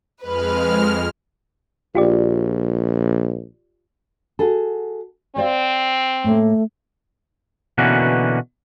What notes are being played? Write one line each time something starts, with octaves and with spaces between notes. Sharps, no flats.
F2 G#3 B4 F6
A#1 F4 G4 D5
F#4 G#4 A4
C4 C5 D5 F5
A2 A3 A#3
B2 D3 E3 A#3 C#4 F#4